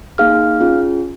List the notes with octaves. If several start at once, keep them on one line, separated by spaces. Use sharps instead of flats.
A#3 D#4 G#4 F5 F6
C#4 F4 G#4